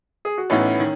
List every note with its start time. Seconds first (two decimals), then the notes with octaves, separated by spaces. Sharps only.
0.25 G#4
0.38 F#4
0.50 A1 A2 E3 B3 C#4 D#4 E4
0.80 D#3